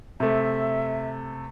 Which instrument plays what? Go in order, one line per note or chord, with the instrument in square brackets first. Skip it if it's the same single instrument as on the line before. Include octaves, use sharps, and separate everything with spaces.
[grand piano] C3 A3 [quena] E5